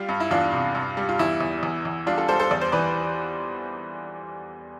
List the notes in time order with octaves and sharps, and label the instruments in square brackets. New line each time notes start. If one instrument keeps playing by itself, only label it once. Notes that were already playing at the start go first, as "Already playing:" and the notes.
Already playing: [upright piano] G3 F4
G2
E4
E2 D4 F4
C3
G2
G3
F4
E2 E4
E2
E2
E2
G3 D4 F4
F4 A4
G3 A4 C5
A4 C5
E2 D5
C5
E3 B4 D5